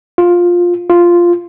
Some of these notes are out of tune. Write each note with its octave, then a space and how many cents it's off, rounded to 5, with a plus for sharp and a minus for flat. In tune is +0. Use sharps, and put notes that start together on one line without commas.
F4 +10
F4 -5